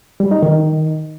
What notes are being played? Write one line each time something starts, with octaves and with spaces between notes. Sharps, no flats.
G3
D#4
D#3